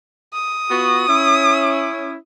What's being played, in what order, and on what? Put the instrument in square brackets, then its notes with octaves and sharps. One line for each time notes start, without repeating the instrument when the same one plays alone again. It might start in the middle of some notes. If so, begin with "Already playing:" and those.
[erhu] D#6
[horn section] B3 F4 F#4
C#4 E4